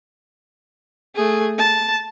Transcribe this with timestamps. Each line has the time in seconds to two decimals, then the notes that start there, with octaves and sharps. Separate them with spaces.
1.15 A3 G#4
1.58 A5